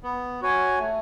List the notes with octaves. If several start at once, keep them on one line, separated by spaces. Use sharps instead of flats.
B3
F#4 C#5 G#5
A3